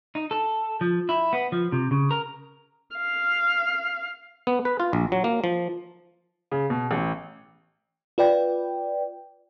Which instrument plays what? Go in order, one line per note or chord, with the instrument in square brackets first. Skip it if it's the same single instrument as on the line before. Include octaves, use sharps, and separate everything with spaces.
[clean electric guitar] D#4
A4
F3
E4
B3
F3
C3
C#3
A#4
[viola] F5
[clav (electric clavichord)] B3
B4
F4
A#1
F#3
A#3
F3
[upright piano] C#3
B2
A1
[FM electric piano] F4 B4 D5 G5